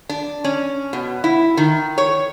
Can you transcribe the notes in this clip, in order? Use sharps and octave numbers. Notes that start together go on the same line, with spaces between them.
D4
C#4
B2
E4
D#3
C#5